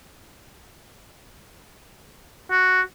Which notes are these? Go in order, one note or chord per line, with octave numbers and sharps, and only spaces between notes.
F#4